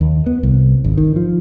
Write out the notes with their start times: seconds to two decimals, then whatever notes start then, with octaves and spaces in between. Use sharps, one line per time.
0.01 D#2
0.26 B3
0.43 C2
0.84 G#1
0.97 D#3
1.16 F3